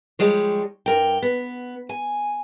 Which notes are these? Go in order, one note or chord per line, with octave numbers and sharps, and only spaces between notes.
F3 G3 G#3 C#5
G2 A#4 G5
B3
G#5